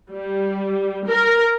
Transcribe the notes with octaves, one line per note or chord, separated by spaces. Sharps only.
G3
A#4